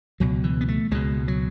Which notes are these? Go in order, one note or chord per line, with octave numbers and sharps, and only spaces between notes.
C#2 B2 F#3
E3
B3
A3
C#2 B2 G#3
F#3